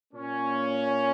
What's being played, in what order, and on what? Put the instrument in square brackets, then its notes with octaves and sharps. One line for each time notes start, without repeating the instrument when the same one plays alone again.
[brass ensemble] A#2 A#3 C#4